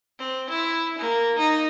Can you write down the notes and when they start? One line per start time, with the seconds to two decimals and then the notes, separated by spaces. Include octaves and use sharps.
0.19 C4
0.50 E4
0.98 A#3
1.38 D#4